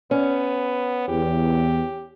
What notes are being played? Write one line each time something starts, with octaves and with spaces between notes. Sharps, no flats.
B3 C#4
E2 G4